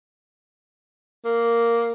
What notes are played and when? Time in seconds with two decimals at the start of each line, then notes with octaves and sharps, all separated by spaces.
1.25 A#3